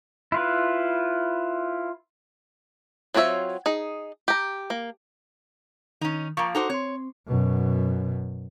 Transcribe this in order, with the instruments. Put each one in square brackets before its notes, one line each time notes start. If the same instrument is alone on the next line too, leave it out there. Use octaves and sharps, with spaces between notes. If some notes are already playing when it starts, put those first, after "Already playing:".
[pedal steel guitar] E4 F4 B4
[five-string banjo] F#3 C4 F4 C#5 E5
D#4 G#4
G4 A#5
A#3
[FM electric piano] D#3 [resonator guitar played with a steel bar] C#4 D#4
[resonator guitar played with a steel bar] F3 A#3 [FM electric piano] C#6
[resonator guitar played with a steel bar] D#4 F#4 C5 [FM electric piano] A4 D6
[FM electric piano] C4 C6 [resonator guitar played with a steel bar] C#5
[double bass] F#2 B2